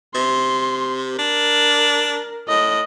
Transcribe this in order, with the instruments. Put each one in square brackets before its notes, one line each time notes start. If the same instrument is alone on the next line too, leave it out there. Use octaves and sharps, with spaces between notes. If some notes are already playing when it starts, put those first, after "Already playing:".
[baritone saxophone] C3 [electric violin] C6
[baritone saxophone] D4 [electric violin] A#4
[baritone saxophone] A2 [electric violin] D#5